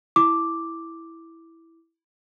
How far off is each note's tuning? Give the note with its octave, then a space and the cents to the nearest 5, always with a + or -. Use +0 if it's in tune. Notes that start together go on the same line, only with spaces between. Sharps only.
E4 +0 D6 +0